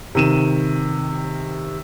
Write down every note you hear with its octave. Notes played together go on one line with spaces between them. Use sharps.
C3 D#3 D#7 E7